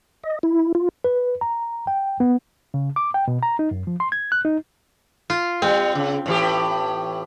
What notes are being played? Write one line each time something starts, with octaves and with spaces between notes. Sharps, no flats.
D#5
E4
F4
B4
A#5
G5
B3
C#3
D6
G5
B2
A#5
D#4
F#2
F3
C6
G#6
F#6
D#4
F4
G3 C4
C#3
A2 E3 G4